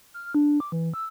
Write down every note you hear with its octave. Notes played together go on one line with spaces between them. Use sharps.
F6
D4
D6
E3
E6